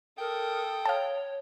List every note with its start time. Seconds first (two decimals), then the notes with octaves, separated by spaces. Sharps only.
0.18 A4 A#4 G5 D#6
0.86 C#5 F5 A5